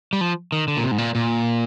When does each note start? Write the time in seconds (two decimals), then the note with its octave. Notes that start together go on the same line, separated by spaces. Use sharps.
0.13 G3
0.21 F3
0.52 D#3
0.68 D3
0.77 A#2
0.83 C3
0.92 G#2
0.98 A#2
1.15 A#2